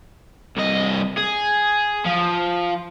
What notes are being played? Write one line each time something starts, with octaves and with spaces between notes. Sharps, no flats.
C2 D#5
G#4
F3